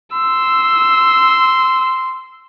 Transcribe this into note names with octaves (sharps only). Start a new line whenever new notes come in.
C6 E6